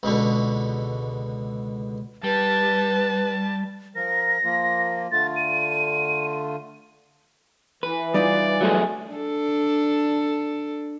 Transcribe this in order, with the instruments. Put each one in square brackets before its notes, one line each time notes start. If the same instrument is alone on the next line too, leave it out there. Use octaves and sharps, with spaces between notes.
[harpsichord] C#2 B2 D3
[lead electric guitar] G3 [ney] B4 [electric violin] A5
[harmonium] F3 A#4 [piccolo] A#6
[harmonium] F3 A#3 F4
[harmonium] D3 A3 F4 [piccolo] A6
[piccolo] D#7
[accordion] E3 [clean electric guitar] B4
[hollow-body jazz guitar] G3 D#4 F4 [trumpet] D5
[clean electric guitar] F#3 A3 G#4
[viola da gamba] D4 A4